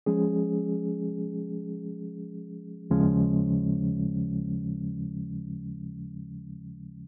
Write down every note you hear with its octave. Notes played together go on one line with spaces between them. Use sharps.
F3 G#3 C#4 G#4
D#2 C#3 F3 G#3 C#4